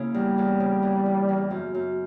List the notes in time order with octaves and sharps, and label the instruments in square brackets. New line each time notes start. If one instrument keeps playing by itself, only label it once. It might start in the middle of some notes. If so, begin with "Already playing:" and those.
Already playing: [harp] C#3 A#3 E4
[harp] E2 [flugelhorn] G3
[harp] E2
C#3
E3
E2
E2
F#2
F#2